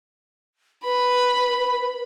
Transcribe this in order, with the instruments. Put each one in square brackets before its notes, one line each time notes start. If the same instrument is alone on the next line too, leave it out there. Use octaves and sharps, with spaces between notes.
[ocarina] B4 [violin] B5